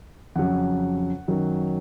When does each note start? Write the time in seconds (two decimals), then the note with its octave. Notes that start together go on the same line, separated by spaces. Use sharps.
0.36 F2 C#3 F#3 F#5
1.28 F#2 D#3 F#3